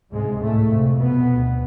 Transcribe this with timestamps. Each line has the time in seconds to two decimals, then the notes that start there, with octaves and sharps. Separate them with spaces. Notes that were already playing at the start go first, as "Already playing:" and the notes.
0.11 C#2 G#2 C3 G#3
0.40 A2 A3
0.70 F2 C3
0.98 B2 B3
1.28 D2 C3